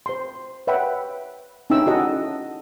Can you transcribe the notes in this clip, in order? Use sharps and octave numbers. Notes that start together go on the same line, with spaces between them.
C5 C6
B4 C#5 E5 F#5 G5 B5
C#4 D#4 E4 G5 E6
F#4 A4 D#5 F#5